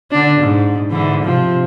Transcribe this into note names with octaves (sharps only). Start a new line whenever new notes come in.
D3 D4
G#2
G#2 D3 E3
C3 F3